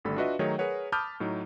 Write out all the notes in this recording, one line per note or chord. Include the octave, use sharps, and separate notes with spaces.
G#1 D3 G3 A3 A4 B5
D4 F4 F#4 B4 D#5 E5
D#3 F#3 A3 D#4 G#4 C#5
G#4 A#4 B4 C#5 F#5
A5 B5 D6 D#6 F6 G6
A2 F#3 D#4